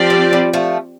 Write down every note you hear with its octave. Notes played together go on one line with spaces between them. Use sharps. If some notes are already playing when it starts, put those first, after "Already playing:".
Already playing: F3 C4 G4 D5
G3
G3
F3 A3